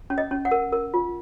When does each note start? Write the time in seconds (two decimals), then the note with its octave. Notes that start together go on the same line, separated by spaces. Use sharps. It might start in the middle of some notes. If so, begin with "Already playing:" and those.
0.10 C#4
0.18 D#5
0.31 C#4
0.45 F#5
0.51 A#4
0.73 A#4
0.94 F4